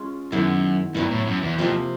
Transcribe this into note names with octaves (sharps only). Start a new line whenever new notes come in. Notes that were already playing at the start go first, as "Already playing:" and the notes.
Already playing: G#3 C#4 F4
F#2 D#3 G#3 B3 E4
G2 F#3 B3 E4
A2
F#2
E2
F2 C3 F3 A#3